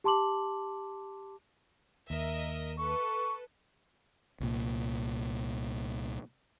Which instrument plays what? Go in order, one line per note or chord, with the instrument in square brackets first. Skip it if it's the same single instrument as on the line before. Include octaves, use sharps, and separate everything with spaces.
[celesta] G4 A5 C6 D6 F#7
[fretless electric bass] D#2 [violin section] A#4 D#5 E5
[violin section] A4 B4 [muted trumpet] C#6
[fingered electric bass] C2 A#2